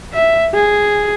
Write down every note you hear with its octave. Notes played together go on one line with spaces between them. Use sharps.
E5
G#4